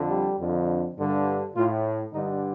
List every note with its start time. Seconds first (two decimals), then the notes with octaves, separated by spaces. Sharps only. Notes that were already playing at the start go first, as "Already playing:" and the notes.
Already playing: F2 D3
0.08 G3
0.37 F2 D3
0.97 G2 D3
1.54 A2 F4
2.13 G2 D3 D#4